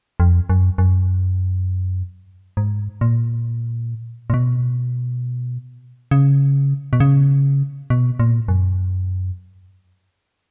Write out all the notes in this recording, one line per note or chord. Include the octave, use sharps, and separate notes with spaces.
F2
F#2
F#2
G#2
A#2
A#2
B2
C#3
B2
C#3
B2
A#2
F#2